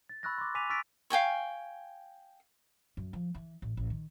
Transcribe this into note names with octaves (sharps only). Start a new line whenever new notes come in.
A6
B5 C#6 E6 F#6 A6 A#6
C6 D6
G#5 D6 B6 D#7 F7
C#6 E6 F6 A6 B6 D7
F5 G5 G#5 C#6
F#2
F3
E3
A1
A1
D#3